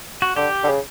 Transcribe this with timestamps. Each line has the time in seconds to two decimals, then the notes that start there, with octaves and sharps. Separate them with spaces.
0.22 F#4
0.36 D3 G4
0.64 D3
0.68 C#3